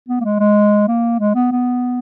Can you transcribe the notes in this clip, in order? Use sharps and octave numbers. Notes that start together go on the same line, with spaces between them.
B3
A#3
G#3
G#3
A#3
G#3
B3
B3